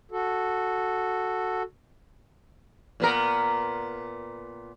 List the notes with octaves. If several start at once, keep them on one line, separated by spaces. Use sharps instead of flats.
F#4 A4
A#2 B3 A#4